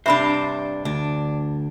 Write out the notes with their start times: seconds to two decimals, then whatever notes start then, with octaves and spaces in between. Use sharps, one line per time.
0.06 G2 C3 D4 C5 E5 B5
0.85 D2 D4